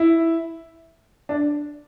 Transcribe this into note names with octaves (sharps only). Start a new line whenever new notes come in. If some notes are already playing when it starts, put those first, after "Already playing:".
Already playing: E4
D4